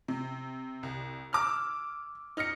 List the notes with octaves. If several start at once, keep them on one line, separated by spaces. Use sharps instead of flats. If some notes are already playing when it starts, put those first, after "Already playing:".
C3
C2
D6 E6 F6
D#4 F6 A#6 C#7